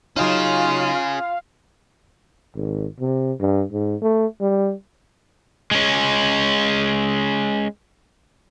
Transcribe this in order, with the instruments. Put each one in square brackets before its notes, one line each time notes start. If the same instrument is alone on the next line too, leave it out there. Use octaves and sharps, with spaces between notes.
[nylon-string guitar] F#3 D#4 [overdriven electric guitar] C#4 G#4 [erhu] F4 [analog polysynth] F5
[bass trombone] G#1
C3
G2
G#2
A3
G3
[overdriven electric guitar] G#3 C#4